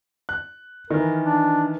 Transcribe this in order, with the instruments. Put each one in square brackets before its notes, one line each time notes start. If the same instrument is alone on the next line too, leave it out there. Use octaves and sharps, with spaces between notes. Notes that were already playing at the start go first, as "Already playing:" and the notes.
[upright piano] F#6
[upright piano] D#3 E3 [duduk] A#4
[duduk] D4